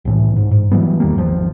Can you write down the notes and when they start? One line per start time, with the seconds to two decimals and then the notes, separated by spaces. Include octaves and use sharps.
0.05 C2 A2 E3
0.36 G#2
0.51 G#2
0.72 E3 F#3 G3 B3
1.00 E2 D#3 G3 A#3
1.15 G#1 E2 F3